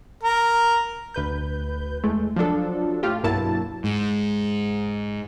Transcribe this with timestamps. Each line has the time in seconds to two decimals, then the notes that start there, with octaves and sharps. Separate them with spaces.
0.23 A#4
1.14 D2 B4 G6
2.04 E2 G#3 A3
2.36 F3 F#3 D4 A4
3.03 A2 A3 F4 G4
3.23 B1 G2 F#3 A#3 E4 A5
3.84 G#2